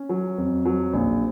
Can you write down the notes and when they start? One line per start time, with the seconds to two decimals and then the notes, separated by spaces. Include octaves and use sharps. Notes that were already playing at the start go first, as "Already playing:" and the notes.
Already playing: C#4
0.09 F#3
0.38 F2
0.65 F#3
0.93 A#1